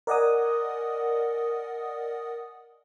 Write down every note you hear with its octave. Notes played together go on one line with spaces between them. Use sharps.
A#4 D5 D#5 F#5 G#5 D#6